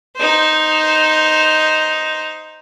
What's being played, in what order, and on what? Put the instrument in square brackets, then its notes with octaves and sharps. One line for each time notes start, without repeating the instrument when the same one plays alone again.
[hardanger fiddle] D#4 C5